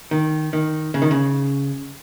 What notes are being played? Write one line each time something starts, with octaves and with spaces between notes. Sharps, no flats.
D#3
D#3
C#3
D#3
C#3